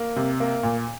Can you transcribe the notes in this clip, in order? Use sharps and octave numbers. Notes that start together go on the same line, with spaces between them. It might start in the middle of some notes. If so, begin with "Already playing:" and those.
Already playing: A#3
C3
A#3
A#2